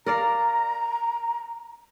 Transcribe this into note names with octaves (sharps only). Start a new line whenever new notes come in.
A#4 D5 F5 A#5